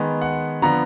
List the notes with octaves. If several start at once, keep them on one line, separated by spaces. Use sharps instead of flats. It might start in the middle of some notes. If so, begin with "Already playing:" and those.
Already playing: D#3 G#3 B3
F#5
D3 F3 B3 A#5